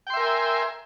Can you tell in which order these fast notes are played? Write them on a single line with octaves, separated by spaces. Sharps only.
G5 C6 E5 A#4 G#5